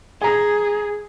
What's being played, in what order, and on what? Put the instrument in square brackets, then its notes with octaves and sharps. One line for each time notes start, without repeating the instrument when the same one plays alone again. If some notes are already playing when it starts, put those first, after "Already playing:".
[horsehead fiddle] G#4 [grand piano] G#5 A#5